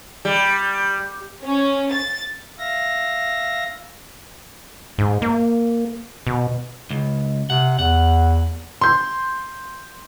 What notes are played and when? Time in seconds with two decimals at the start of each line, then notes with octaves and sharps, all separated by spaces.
0.25 G3
1.44 C#4
1.93 A6
2.59 E5 F5 A#6
4.98 G#2
5.22 A#3
6.27 B2
6.90 C#2
7.50 C3 F#5
7.79 E2 F#5
8.81 C6 G6